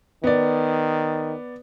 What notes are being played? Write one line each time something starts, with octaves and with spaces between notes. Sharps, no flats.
D#3 B3 D5